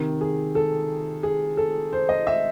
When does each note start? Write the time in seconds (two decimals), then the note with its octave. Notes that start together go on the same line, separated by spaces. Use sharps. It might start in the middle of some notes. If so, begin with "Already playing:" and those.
Already playing: C3 D#3
0.21 G#4
0.55 A4
1.23 G#4
1.57 A4
1.93 C5
2.09 D#5
2.27 E5